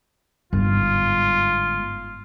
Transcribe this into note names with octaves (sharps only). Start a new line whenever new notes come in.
G1 G#2 F4